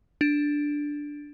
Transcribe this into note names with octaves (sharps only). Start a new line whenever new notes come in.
D4